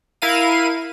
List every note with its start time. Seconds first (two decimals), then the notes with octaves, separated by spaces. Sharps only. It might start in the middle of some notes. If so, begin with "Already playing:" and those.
0.22 E4 A#4 F5 D#7